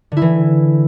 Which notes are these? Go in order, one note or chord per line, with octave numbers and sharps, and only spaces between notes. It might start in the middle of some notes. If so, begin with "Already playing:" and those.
D3 E3 E4